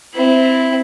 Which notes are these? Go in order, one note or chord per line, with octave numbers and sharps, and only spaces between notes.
C4 E4